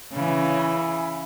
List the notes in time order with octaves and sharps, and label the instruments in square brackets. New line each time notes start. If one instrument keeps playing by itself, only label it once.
[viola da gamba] C#3 E3